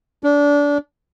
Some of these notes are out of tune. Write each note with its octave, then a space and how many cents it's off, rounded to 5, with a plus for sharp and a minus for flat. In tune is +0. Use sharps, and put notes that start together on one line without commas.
D4 -25